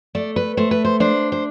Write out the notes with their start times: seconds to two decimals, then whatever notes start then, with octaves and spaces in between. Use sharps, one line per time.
0.15 A3 D5
0.36 B4
0.57 A3 C5
0.71 B4
0.85 C5
1.00 D4 C5
1.32 C5